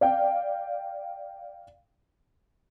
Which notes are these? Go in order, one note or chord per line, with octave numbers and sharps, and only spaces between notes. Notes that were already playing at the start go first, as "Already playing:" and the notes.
D5 F5 G5